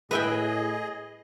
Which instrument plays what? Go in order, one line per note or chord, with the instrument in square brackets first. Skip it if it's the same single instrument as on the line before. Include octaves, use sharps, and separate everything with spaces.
[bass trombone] A2 [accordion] G#4 D#5 [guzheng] B4 E5 G5